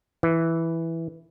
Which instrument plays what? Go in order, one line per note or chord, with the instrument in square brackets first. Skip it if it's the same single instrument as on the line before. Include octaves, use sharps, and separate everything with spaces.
[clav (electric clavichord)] E3